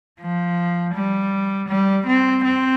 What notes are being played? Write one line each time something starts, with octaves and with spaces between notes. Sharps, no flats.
F3
G3
G3
C4
C4